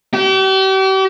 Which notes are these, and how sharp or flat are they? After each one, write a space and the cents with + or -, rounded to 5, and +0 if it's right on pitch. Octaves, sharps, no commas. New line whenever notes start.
G4 -40